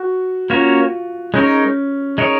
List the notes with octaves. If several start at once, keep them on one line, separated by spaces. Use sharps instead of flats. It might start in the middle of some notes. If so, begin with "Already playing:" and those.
Already playing: F#4
A#3 C#4 F4 F#4 A#4 C#5
G#3 C#4 D#4 A#4 C#5
G#3 D#4 A#4 C#5